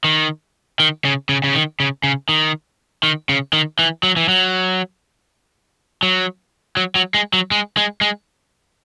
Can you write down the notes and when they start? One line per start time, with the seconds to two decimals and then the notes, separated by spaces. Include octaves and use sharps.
0.04 D#3
0.80 D#3
1.05 C#3
1.29 C#3
1.44 C#3
1.55 D#3
1.80 C#3
2.04 C#3
2.29 D#3
3.03 D#3
3.29 C#3
3.53 D#3
3.79 E3
4.03 F#3
4.17 E3
4.29 F#3
6.03 F#3
6.77 F#3
6.95 F#3
7.14 G#3
7.33 F#3
7.51 G#3
7.77 G#3
8.01 G#3